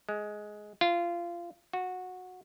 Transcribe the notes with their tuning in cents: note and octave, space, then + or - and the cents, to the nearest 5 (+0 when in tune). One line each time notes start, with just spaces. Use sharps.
G#3 +10
F4 -20
F#4 -15